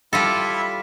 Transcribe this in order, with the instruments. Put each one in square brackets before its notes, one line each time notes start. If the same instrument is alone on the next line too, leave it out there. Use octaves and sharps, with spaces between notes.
[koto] G3 F4 A4 [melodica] E4 E5